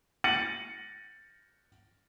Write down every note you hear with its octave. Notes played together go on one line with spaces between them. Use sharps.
A6 A#6 C#7 D#7 F#7